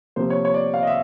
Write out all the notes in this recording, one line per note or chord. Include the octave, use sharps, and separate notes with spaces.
C3 F3 A#3 C5
C#5
C#5
D5
F5
D#5
E5